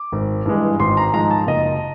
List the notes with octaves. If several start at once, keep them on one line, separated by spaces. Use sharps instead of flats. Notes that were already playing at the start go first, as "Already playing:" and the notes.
Already playing: D6
G#1
G2 E3 G#3
G#1 C6
A#5
G#2 F3 G#3 A#5
A5
F#1 D#5